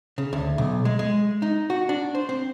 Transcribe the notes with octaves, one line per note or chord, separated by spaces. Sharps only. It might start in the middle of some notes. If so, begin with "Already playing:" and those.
C#3
D2
B1
G#3
G#3
D#4
F#4
D4
C5
C4